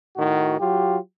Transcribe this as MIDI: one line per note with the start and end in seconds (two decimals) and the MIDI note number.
0.17 0.56 45
0.17 0.56 51
0.17 0.56 66
0.59 0.97 54
0.59 0.97 65
0.59 0.97 67